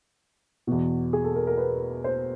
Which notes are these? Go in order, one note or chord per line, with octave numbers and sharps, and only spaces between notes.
E2 B2
G#4
A4
A#4
A#4
B4
C5